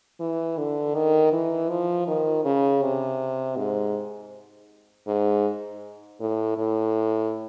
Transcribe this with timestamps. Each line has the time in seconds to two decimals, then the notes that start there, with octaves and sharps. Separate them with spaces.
0.20 E3
0.58 D3
0.95 D#3
1.32 E3
1.70 F3
2.08 D#3
2.45 C#3
2.82 C3
3.57 G#2
5.07 G#2
6.20 A2
6.58 A2